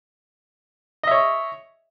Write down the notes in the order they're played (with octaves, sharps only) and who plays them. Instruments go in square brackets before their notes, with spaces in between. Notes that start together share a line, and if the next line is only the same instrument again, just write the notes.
[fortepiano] D#5
E5
C#5